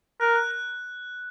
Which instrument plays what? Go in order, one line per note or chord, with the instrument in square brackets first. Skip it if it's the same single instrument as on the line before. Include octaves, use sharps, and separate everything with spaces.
[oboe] A#4 [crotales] F#6
[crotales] F#6
F#6